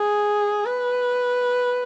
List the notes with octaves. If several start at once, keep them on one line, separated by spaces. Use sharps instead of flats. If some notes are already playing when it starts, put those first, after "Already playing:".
Already playing: G#4
B4